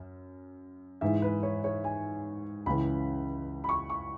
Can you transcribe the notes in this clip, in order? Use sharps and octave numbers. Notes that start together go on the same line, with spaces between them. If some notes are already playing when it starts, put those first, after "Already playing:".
Already playing: F#2
G#2 E3 E5
B4
C#5
C#5
G#5
C#2 C#3 E3 B5
B5
C#6
C#6